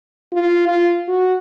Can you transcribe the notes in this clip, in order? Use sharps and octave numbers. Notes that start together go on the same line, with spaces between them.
F4
F4
F#4